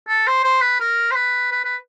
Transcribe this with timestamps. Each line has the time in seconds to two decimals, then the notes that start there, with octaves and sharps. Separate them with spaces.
0.08 A4
0.27 C5
0.44 C5
0.62 B4
0.80 A#4
1.11 C5
1.16 B4
1.52 B4
1.65 B4